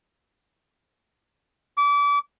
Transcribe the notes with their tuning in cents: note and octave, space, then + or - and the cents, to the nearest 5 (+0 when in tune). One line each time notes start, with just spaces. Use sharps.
D6 -35